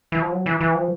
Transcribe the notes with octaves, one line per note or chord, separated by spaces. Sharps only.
E3
F3
F#3
E3
E3
F3